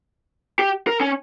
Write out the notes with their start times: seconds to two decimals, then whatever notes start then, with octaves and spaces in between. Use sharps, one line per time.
0.59 G4
0.87 A#4
1.01 C#4